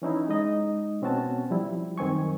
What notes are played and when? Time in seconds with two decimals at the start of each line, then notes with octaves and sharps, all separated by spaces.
0.02 E3 C#4 D#4 E4
0.28 G#3 D#4 D#5
1.02 B2 C4 C#4 F#4 A5
1.50 F3 G3 E4
1.98 F#2 D#3 C4 G#5 C#6